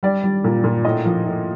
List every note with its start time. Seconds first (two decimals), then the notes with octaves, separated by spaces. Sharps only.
0.03 G3 D5
0.24 G3
0.44 A#2
0.64 A#2
0.85 A2 D#5
1.05 F3
1.25 A2